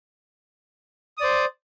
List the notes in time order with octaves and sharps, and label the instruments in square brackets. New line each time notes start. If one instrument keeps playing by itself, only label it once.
[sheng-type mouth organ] D#6
D5
C5